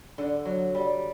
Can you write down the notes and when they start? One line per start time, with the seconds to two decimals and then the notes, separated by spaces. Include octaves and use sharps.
0.18 D3
0.45 F#3
0.75 G3